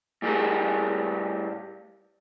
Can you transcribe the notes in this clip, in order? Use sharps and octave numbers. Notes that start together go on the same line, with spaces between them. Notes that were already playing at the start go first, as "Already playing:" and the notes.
A2 G3 A3 G#4 A#4